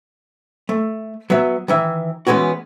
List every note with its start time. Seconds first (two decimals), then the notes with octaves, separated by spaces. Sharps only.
0.69 A3
1.30 F#3 B3 E5
1.68 D#3 E3 E5
2.27 E3 G#3 B3 C#4 F#4